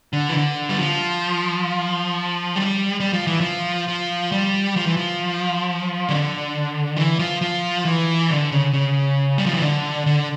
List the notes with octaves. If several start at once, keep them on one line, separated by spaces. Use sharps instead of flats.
D3
E3
D3
G3
F3
G3
G3
F3
E3
F3
F3
G3
F3
E3
F3
D3
E3
F3
F3
E3
D3
C#3
C#3
G3
F3
E3
D3
D3